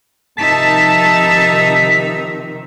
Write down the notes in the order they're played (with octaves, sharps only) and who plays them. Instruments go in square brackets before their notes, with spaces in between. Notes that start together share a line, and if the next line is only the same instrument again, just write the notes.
[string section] C3 D#3 F3 [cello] D#4 E5 [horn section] A5 [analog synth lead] B6